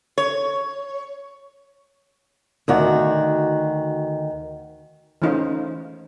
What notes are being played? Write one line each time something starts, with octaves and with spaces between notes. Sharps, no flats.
C#5
D2 D#3 F#4
E3 A3 C#4 D#4 F4 C5